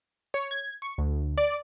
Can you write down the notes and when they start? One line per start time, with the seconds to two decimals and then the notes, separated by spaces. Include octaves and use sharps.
0.34 C#5
0.51 G#6
0.82 C#6
0.98 D2
1.38 D5